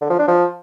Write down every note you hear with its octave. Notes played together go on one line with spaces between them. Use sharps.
D3
F3
D4
F3